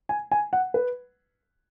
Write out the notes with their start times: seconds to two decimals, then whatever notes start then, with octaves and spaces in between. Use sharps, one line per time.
0.09 G#5
0.32 G#5
0.53 F#5
0.74 B4